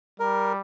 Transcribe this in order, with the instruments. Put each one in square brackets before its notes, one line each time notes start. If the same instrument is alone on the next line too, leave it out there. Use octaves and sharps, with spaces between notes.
[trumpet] G3 [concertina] A#4